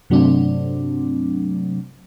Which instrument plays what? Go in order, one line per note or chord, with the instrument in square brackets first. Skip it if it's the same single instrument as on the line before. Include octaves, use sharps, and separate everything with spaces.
[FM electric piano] G2 C3 F#3 A3 C4 D4